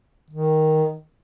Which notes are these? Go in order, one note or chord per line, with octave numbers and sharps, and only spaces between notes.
D#3